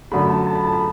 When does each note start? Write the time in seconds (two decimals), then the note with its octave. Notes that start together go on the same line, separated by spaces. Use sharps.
0.12 F#2 D3 A3 B5
0.29 A5
0.47 A5
0.55 B5
0.64 A5
0.73 B5